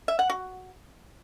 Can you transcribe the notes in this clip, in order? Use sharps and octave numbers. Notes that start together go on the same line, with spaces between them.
E5
F#5
F#4